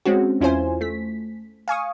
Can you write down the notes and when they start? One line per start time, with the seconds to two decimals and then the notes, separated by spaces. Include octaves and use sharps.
0.05 G#3 C4 C#4 F#4
0.41 E2 C#4 E4 F4 C5 G#5
0.81 A3 B6
1.68 F5 G#5 C#6 D#6